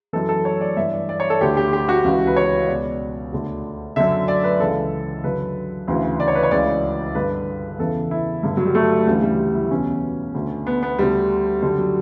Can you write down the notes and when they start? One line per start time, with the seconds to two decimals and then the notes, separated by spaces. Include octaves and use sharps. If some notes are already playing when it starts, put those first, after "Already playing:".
0.13 F#2 E3 A4
0.29 A4
0.45 C#5
0.61 D5
0.77 G2 E3 E5
0.93 D5
1.09 D5
1.20 C#5
1.30 A4
1.41 D2 D3 G4
1.57 G4
1.73 G4
1.89 F#4
2.04 C#2 C#3 E3
2.27 B4
2.36 C#5
2.68 C#2 B2 D5
3.32 D2 D3
3.96 F#2 D3 E5
4.28 D5
4.44 B4
4.60 C#2 C#3 E3 A4
5.24 F#2 D3 B4
5.88 D2 C#3 E3
6.20 D5
6.28 C#5
6.35 B4
6.43 C#5
6.51 C#2 C#3 E3 D5
7.15 G2 D3 B4
7.79 E2 C#3 E3 A4
8.11 E4
8.43 G2 D3
8.57 F#3
8.66 G3
8.75 A3
9.07 D2 C#3 E3 G3
9.23 G3
9.39 G3
9.55 E4
9.71 E2 B2 C#4
10.34 D2 D3
10.67 B3
10.83 B3
10.98 D2 D3 G3
11.62 F#2 D3 G3
11.78 F#3